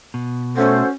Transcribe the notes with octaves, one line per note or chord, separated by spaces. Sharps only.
B2
A3 C#4 F#4 A4 C5